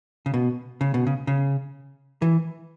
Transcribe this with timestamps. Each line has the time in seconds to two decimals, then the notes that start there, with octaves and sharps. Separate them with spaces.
0.26 C#3
0.34 B2
0.81 C#3
0.94 B2
1.07 C#3
1.27 C#3
2.22 E3